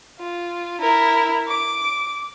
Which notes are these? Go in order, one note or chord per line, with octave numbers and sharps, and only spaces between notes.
F4
E4 A#4
D6